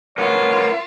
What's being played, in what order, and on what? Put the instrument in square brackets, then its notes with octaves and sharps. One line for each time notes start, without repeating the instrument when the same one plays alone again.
[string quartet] F4 [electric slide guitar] A#4 B4 F#5 [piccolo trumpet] C#5